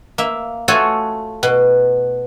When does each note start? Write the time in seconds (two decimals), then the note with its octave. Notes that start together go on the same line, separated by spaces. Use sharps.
0.18 A#3 E5
0.68 A3 F4 F#4 A4 C#5 G#5
1.43 B2